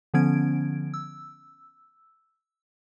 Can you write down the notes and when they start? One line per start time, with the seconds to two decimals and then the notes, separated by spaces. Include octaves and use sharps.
0.14 D3 F3 B3 C#4 G#6 D7
0.94 E6